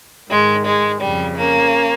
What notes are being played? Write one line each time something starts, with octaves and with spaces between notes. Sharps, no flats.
G#2 D#3 G#3
G#3
F2 C#3 G3
A#3 C#4